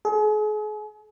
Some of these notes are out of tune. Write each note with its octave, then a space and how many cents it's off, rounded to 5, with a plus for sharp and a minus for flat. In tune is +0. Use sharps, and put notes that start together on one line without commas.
G#4 +40